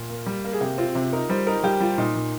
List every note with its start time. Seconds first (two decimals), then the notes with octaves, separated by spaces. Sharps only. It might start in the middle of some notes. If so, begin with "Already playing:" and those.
Already playing: A#2
0.10 A#3
0.26 G3
0.44 A#3
0.53 G#4
0.61 C3 G4
0.78 C4 F4
0.95 C3
1.13 D#4 A#4
1.29 G3 C5
1.47 D#4 A#4
1.63 G3 G4
1.80 G3 F4
1.98 A#2 D#4
2.15 A#2